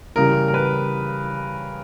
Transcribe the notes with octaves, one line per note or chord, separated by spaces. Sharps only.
C#3 E3 G3 A#4
A#4
B4